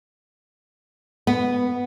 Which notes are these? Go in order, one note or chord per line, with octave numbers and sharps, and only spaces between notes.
B3